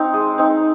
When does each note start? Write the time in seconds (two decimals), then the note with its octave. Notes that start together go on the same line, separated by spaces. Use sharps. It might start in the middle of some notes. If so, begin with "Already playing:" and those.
Already playing: C4 D#4
0.14 G#3
0.38 C4 D#4